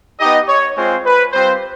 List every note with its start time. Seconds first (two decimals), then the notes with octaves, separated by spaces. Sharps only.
0.19 B3 D#4 G4 D#5
0.48 C#5
0.76 G#3 C4 F4 C5
1.05 B4
1.32 G3 C4 F4 C5